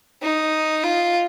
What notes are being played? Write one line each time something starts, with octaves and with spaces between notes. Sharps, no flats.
D#4
F4